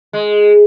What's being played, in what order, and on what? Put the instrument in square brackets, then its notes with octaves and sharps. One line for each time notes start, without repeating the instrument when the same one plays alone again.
[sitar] G#3